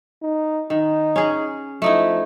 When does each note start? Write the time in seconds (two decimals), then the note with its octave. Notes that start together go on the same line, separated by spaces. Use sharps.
0.22 D#4
0.70 D#3 D#4
1.16 C#4 G#4
1.82 F3 A3 D#4 E4